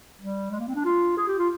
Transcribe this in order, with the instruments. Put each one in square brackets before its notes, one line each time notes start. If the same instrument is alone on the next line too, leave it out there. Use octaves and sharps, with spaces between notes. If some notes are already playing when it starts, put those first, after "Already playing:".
[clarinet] G3
G#3
A#3
C4
D4
F4
G#4
G4
F4